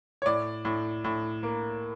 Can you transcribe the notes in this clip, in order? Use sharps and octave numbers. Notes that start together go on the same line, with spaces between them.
C#5
A2 D5
A2
A2
A#3